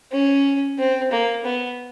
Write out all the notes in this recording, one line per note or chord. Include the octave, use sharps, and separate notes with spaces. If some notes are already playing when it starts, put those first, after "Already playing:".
C#4
C4
A#3
B3